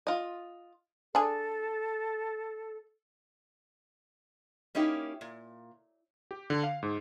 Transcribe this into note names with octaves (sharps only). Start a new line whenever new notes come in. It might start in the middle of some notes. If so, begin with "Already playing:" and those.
F4 D#5
D4 G#4 A4
A#3 C#4 D#4 E4 G4
A#2
G4
D3
F5
G#2